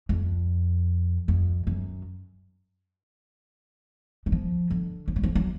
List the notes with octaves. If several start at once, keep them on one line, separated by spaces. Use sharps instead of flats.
F2
F2
F#2
F#3
F3
D3
F3
F#3
F3
F#3